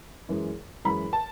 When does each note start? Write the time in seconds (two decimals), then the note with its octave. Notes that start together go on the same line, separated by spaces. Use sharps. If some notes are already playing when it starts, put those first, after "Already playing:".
0.29 F#2 E3 G#3
0.84 F#2 E3 G#3 B5
1.13 A5